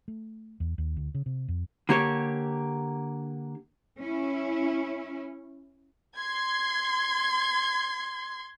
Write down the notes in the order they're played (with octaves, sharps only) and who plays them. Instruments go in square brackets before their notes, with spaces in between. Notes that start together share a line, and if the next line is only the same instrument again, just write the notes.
[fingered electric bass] A3
E2
D#2
D2
C#3
C3
F2
[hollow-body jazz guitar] D3 A#3 G4 C#5
[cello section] C#4 E4
[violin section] C6 G#6